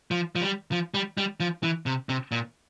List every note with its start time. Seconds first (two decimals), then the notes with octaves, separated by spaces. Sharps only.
0.11 F3
0.35 F3
0.41 G3
0.72 F3
0.94 G3
1.17 G3
1.40 F3
1.63 E3
1.86 C3
2.09 C3
2.32 A#2